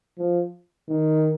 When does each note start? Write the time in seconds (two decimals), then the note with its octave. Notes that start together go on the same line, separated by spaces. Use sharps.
0.18 F3
0.89 D#3